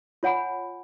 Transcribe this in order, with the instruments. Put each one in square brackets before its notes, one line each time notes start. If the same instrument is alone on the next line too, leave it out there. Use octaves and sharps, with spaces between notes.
[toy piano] F4 C#5 F#5 G#5 B5